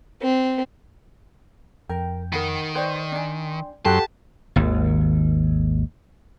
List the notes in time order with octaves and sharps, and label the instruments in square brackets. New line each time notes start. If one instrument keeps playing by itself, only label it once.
[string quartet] C4
[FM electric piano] F2 G5 [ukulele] A#4
[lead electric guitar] D#3 [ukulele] A#4 F#5 B5
[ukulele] B4 C5 [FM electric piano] D5 G5 C6
[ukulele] D4 G#5
[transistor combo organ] F#2 C6 [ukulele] G4 [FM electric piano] A4 F#5 F#6 [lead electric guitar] A5
[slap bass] G#1 D#2